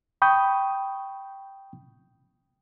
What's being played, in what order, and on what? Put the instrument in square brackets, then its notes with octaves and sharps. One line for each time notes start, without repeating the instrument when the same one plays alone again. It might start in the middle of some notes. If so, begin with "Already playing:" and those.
[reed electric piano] G5 B5 C#6 D#6 G6